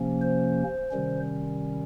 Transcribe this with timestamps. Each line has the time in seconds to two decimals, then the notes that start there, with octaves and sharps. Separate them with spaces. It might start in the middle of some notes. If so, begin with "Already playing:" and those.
Already playing: C3 F3 A#3 C#4
0.21 C5
0.91 C3 D#3 G3 C#4